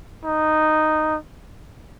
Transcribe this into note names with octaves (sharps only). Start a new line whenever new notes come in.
D#4